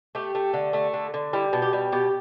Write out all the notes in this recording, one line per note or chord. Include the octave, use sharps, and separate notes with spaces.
A3 G4
A3
D3
A3
D3
D3
G3 E4
B2
G4
G3
B2 G4